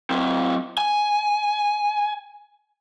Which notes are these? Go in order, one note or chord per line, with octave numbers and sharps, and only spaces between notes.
F#3 C4
G#5